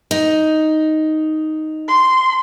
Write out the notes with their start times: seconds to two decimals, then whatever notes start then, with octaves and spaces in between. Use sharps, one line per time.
0.11 D#4
1.88 C6